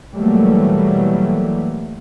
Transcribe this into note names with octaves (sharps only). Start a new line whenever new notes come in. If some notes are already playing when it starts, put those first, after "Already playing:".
B2 E3 F#3 G3 A3 A#3